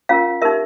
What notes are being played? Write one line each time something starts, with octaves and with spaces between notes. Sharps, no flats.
C#4 F4 A#4 F5
D#4 G4 A#4 E5